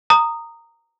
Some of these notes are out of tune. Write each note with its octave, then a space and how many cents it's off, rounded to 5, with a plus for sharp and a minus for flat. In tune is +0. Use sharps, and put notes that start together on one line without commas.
A#5 -15 D#6 -10